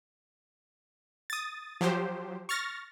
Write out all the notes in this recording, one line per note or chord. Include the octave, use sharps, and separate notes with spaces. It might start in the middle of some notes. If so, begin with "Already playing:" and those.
D#6 A6
F3 F#3 G4 C5
C#6 F6 A6 A#6